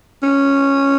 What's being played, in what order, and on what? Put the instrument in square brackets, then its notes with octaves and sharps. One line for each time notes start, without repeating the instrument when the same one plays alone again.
[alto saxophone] C#4